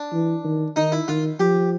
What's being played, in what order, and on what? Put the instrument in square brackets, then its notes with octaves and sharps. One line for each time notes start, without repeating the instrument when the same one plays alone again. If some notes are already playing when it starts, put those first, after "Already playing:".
Already playing: [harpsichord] D4
[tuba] E3
D#3
[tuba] D#3 [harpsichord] D#4
[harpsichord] E4
[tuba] D#3 [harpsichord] F4
[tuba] F3 [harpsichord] G4